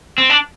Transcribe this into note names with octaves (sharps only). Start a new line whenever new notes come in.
C4
D4